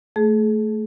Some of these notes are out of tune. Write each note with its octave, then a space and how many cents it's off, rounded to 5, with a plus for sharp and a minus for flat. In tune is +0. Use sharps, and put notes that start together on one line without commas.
A3 +0 G#4 +35